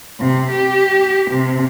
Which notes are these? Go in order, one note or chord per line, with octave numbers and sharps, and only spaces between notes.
C3
G4
C3